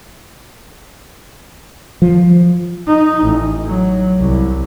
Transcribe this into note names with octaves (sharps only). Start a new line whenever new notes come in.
F3
D#4
A1
F#3
C2